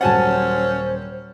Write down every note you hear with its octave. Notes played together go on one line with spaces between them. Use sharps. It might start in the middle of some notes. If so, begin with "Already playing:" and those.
D#1 F#3 C#4 C5 F#5 G#5 A5 A6